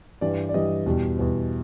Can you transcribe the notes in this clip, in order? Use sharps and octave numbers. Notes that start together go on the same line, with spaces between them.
G2 E3 G3 D5
D5
G2 E3 G3 D#5
E2 B2 G3
E2 B2 G3